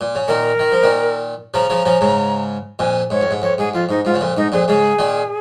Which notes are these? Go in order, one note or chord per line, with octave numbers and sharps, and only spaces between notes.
A#2
C#3
A#2 D#3 A#4
D#3
F3
A#2 D#3
C#3 F3 A#5
C#3 F3
C#3 F3
G#2 C#3
F2 A#2 G#5
G#2 C#5
F2
G#2
F2 C#5
G#2 G#4
F2 F4
G#2 D#4
G#2 F4
C#3
F2 A#2
G#2 D#4
F2 A#2 G#4
G#2 C#3 G#4
A#2 D#3